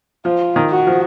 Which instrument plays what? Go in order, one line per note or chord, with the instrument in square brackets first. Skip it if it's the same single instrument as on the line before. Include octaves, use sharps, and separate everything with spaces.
[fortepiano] F3 [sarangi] F4
[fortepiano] D#3
[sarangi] F#4
[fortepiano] F3